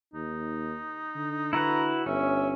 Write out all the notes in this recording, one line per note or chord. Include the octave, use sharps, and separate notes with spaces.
D#2 D#4
D3
E4 F#4 B4 A#5
G1 C#4 E5